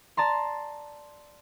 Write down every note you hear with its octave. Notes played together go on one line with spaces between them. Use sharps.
D5 A5 A#5 C6